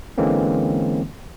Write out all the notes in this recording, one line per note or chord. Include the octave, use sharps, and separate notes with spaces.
D3 E3 G#3 A#3 C4 C#4